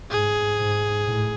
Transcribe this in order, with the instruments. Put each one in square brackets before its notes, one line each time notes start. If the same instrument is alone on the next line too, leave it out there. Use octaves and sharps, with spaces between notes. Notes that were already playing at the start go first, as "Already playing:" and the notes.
[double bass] G#2 [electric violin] G#4
[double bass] G#2
A2